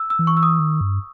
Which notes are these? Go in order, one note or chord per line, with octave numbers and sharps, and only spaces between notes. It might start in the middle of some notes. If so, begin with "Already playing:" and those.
Already playing: E6
E6
E3
C#6
E6
D#6
D#3
G2